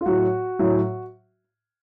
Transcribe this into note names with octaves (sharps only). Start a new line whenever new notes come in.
F4
A2 F#3 F#4
A2 F#3